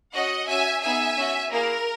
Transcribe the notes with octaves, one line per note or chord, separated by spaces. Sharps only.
C#4 F#4 D#5 F#5
C#4 F#4 E5 G#5
B3 D#4 G#4 E5 G#5
C#4 F#4
A#3 E4 G#4 A#4